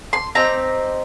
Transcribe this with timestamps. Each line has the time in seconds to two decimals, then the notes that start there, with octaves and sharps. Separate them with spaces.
0.13 C6
0.35 C4 D#4 G4 A#5